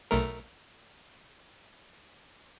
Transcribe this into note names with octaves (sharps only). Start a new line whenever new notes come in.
B1 A3 A#4